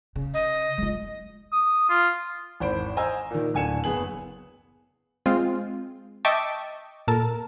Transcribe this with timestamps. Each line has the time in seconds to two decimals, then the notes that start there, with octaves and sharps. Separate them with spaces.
0.16 C#3
0.34 D#5
0.78 G#3 F4
1.53 D#6
1.90 F4
2.60 G#1 E2 C5 B5 D7
2.97 C5 D#5 G#5 A#5 E6
3.31 A#2 D#3
3.54 D1 D3 G#5 C#7 E7
3.84 F#1 B3 G#4 F#7
5.26 G#3 C4 F4
6.25 D#5 E5 G5 A5 C#6 D6
7.08 A#2 A4 A#4 A5